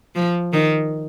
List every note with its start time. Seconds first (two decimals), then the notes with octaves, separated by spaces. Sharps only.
0.15 F3
0.53 D#3